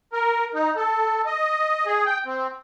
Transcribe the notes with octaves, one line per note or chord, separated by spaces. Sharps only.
A#4
D#4
A4
D#5
G#4
G5
C4